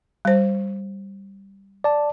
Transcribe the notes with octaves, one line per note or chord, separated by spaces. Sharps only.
G3 C5
D5 A5